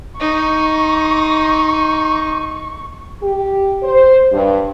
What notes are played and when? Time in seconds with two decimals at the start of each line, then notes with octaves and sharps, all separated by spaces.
0.20 D#4 C#6
3.22 G4
3.82 C5
4.32 G2